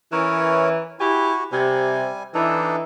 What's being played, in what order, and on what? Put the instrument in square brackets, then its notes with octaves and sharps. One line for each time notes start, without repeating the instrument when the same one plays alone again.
[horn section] E3 [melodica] C#4 A#4 C#5
[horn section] E4 G4 G#5 [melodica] F#4
[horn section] C3 [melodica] G3 G#5
[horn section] E3 [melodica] D4 D#4 A4